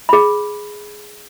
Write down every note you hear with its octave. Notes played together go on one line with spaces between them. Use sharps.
G#4 B5